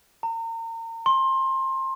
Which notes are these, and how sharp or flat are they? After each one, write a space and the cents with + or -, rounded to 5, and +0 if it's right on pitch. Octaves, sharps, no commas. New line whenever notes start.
A#5 -35
C6 +25